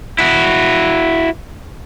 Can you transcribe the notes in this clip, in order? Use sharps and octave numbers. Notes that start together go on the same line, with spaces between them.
E4 F#4